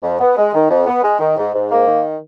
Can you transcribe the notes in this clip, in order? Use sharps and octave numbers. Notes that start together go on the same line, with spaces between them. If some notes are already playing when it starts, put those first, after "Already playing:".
F2
B3
G#3
D#3
F2
B3
G#3
D#3
G#2
G#2
A#3
D#3